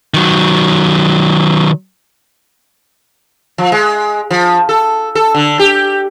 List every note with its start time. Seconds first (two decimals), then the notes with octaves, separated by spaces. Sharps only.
0.14 D#3 F#3
3.58 F3
3.72 G#3
4.31 F3
4.69 A4
5.15 A4
5.35 D3
5.59 G4